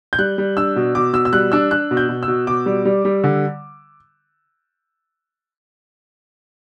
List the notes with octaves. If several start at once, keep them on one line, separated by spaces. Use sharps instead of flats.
G6
G3 F#6
G3
D4 E6
B2
B2 D6
B2 E6
E6
G3 F#6
D4 E6
D4 F#6
B2
G6
B2
E6
B2
B2 D6
G3
G3
G3
D3